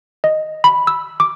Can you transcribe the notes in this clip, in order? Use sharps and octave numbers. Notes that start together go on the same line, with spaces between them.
D#5
B5
E6
D6